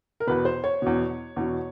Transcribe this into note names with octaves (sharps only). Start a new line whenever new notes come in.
A#4
E2 B2 B4
C5
C#5
E2 B2
E2 B2